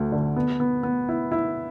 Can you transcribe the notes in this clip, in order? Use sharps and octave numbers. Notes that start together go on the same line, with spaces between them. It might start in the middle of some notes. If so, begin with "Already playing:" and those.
Already playing: D2 A3
D3
B3
B3
B3
E4
E4